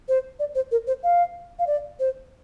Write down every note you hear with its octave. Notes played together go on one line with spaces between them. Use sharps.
C5
D5
C5
A#4
C5
F5
F5
D5
C5